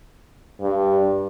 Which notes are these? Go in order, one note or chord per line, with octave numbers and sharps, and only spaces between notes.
G2